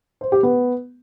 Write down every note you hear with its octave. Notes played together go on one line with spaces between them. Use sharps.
C5
G4
B3